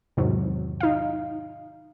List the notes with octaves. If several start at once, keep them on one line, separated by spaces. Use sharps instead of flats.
E2 G#2 C3 D#3 F#3
D#4 F5